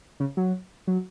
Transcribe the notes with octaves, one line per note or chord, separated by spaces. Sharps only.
C#3
F#3
F#3